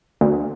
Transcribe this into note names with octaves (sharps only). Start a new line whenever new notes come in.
D2